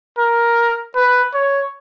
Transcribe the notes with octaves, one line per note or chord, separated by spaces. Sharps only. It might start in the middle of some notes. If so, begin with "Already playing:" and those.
A#4
B4
C#5